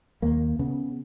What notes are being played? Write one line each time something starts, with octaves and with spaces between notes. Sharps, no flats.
D#2 A#3
C#3 B3